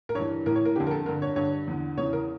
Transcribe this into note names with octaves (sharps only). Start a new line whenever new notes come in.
A#4
G2 E3 C#5
A2 E3 A#4
C#5
A#4
F2 D3 G4
A#4
A4
G2 D3 A#4
C#5
G2 D3 C#5
E2 D3
E2 C#3 E3 C#5
A#4